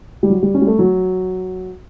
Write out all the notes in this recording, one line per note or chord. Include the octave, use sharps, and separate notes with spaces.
G3
F#3
G3
C#4
G3
A3
F#3